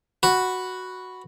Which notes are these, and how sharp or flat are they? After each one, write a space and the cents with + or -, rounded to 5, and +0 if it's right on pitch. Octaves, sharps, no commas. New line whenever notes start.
F#4 +0 B4 +0